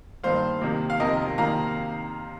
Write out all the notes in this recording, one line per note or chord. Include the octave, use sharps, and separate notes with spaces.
G2 D#3 A#3 C5 F5
C3 D#3 A#3
F5
F2 C3 D#3 A#4 D#5
C3 D#3 A#3 F5 A#5